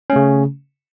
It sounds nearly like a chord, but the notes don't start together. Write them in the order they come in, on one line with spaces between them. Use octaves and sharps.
C#4 A3 C#3